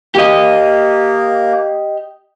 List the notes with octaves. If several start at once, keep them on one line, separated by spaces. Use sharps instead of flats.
A#3 G4 D#5